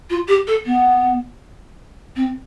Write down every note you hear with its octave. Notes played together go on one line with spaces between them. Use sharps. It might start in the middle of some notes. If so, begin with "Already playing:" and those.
F4
G4
A4
B3
C4